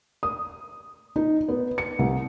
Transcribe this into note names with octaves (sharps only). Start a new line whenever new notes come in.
D#6
D#4
B3
C#7
C2